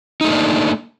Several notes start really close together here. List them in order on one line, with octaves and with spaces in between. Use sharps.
D#4 A3 A#3 D4